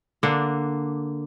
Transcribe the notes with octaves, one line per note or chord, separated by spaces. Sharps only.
D3 A#3 D4